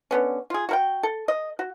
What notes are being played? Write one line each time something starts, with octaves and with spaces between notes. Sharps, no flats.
D3 B3 C#4
F4 G#4
F#4 A#4 G5
A4
D#5
F#4